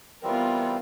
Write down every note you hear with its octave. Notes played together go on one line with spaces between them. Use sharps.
E3 G3 B3 C4 F4 A#4